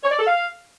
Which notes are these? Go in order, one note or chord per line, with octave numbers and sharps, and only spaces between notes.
C#5
D5
A4
F5